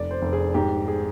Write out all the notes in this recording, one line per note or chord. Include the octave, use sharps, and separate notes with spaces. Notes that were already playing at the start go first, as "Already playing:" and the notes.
Already playing: F1 D5
C5
F1
G#4
G#2 G4
G#4